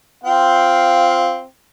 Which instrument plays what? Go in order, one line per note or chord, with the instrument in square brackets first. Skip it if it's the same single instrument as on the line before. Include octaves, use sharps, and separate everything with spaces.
[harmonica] C4 G5 [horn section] F4 F5